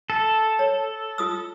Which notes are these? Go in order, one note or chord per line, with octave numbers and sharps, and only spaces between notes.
A4
C#5
F4 D#6 E6